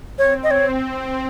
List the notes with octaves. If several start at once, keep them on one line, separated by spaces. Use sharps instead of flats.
C4 C#5
D#5
C#5